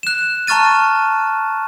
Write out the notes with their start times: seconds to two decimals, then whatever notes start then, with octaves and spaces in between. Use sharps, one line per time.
0.03 F#6 E7
0.47 A5 A#5 C#6 F6 A6 D#7